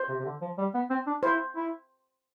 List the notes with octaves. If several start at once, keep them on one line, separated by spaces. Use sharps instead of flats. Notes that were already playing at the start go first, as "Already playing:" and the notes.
Already playing: C5
C3
C3
D3
F3
G3
B3
C4
D4
E4 C5
E4